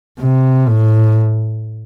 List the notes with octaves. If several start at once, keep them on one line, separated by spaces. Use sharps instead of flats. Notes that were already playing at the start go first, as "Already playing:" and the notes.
C3
A2